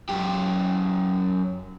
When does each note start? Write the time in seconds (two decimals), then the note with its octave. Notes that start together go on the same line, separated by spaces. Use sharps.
0.09 F#2 G4